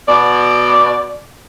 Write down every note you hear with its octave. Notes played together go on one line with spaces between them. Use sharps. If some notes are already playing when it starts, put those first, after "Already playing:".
B2 D5